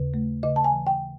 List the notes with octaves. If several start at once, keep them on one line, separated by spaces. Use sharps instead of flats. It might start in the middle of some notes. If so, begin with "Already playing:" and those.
Already playing: D#2 C#3
A3
C#3 D#5
A5
G#5
E3
G5